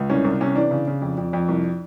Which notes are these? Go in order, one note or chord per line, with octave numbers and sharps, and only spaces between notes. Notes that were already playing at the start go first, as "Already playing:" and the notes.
Already playing: C#2
C2 C#4
C2
C3 C#4
E3 D4
C#3
C#3
F2
F2
F2
C2